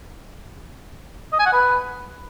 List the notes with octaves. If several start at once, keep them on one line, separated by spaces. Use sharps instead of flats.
D#5
G#5
F#5
B4